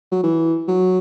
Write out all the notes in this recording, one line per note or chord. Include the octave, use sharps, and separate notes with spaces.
F#3
E3
F#3